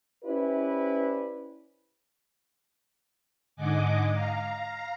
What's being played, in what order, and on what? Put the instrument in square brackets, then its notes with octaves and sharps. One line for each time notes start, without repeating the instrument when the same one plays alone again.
[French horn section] C#4 E4 G4 B4 C5 D5
[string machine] G#2 D3 D#5 F#5 G#5 D6
F5 A#5